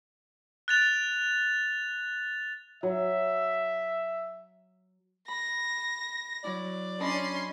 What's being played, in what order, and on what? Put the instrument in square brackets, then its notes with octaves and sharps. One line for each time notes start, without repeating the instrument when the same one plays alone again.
[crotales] F#6 A6 F7
[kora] F#3 [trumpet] E5
[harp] B5 [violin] A#6
[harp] F#3 E4 [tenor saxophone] D5
[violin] C#4 C6 [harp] D4 D#5 B5